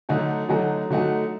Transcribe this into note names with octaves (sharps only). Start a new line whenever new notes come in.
D3 F#3 A3 D#4 F#4
D3 F#3 A3 D#4 F#4
D3 F#3 A3 D#4 F#4